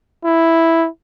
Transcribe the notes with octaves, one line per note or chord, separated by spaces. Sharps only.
E4